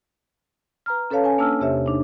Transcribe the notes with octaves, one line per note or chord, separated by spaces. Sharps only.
B4 A#5 F6
C#4 A4 B4 C#5 F5 A5
C#4 G#5
A#3 D4 A5 E6 F6
E2 C3 G4 C#5 E5
D4 D#4